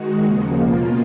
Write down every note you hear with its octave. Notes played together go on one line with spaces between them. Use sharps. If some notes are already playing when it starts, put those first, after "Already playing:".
Already playing: D#3 G#3 D#4 F#4
D#2 C#3 F3 A#3
B2 A#3 F4